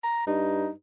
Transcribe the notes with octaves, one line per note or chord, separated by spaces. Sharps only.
A#5
G2 D#4